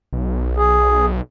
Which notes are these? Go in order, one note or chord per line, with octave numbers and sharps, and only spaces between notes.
B1
G#4